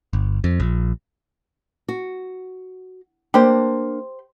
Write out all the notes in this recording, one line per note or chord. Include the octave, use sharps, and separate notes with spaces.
G1
F2
A#1
F#4
A#3 D4 G4 C5